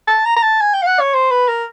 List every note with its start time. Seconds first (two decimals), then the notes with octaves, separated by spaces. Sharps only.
0.08 A5
0.25 A#5
0.36 A#5
0.42 A5
0.61 G#5
0.74 G5
0.82 F5
0.87 F#5
1.00 C#5
1.14 C5
1.31 B4
1.48 A#4